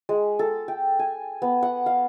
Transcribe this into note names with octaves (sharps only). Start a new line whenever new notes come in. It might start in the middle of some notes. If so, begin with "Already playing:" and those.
G#3
A4
G5
G#5
B3
F#5
F5